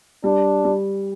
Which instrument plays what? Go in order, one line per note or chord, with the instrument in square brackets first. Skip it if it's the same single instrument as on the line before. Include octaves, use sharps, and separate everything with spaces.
[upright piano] G3 [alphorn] D4
[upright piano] G3